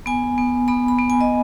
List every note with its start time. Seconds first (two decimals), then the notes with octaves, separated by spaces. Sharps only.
0.06 B3 G#5
0.38 B3
0.68 B3 B5
0.88 B5
0.99 B3
1.10 G#5
1.21 D#5